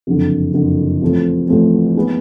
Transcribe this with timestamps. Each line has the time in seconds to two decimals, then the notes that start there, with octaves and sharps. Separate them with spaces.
0.07 F#1 F2 D3
0.54 F#1 F2 D3
1.02 A1 A2 F3 A3 C4
1.48 A1 A2 F3 A3 C4
1.97 D#3 G#3 B3